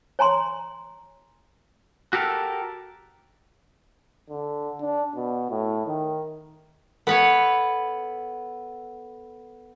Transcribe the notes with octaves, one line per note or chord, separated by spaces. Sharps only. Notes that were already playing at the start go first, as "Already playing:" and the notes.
C#5 G#5 A#5 C6
F#4 G4 A4 A#4
D3
D4
B2
A2
D#3
B3 A4 B4 C#5 F#5